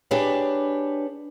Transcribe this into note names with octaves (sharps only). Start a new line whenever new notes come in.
D4 G4 G#4 B4 C#5